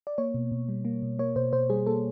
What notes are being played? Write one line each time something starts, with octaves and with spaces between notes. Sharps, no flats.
D5
A#3 C#5
B2
B2
G3
A#3
B2
A#3 C#5
B2 C5
B2 C5
G3 G#4
A#3 A4